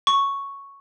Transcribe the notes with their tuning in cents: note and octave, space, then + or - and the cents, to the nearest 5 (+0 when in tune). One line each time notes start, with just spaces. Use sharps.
C#6 +0